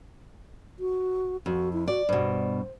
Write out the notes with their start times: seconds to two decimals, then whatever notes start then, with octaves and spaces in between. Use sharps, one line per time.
0.79 F#4
1.46 F2 F#4
1.73 E4
1.88 F#4 D5
2.09 G2 B2 C5